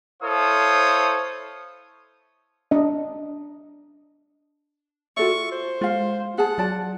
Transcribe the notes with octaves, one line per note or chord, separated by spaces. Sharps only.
E4 A4 C5 C#5 F5 D#6
D4 D#5
F4 F#4 A4 D5 E5 C#6
C5
G#3 F4 F5
G#4 F#5 A5
F#3 F4 D5 A5